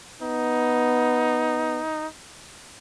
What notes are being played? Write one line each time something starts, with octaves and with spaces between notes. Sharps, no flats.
B3 D#4